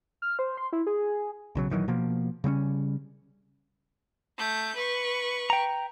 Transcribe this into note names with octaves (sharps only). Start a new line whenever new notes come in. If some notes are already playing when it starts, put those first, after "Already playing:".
F6
C5
C6
E4
G#4
B1 C#3 F#3
A#1 D#3 E3 F#3
B2 F3 A#3
C#3 G3 C4 C#4
A3 G6
B4 C#6
G5 A#5